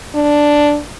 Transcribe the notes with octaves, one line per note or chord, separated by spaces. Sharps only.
D4